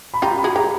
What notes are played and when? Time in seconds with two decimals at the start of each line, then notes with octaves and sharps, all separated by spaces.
0.14 B5
0.22 F4 G4 A#5
0.38 B5
0.44 F#4 G#4
0.56 G4 A#5